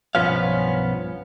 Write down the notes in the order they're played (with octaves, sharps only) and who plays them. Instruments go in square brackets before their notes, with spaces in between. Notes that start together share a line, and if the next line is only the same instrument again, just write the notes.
[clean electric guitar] B1 G2 F3 B3 C#4 F5